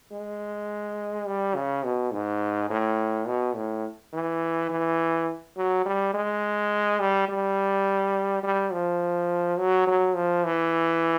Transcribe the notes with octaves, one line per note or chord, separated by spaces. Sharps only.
G#3
G3
C#3
B2
G#2
A2
B2
A2
E3
E3
F#3
G3
G#3
G3
G3
G3
F3
F#3
F#3
F3
E3